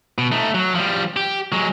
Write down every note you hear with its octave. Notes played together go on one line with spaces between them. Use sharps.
B2
A3 D#4
F#3
F3 G3
G4
F#3 G#3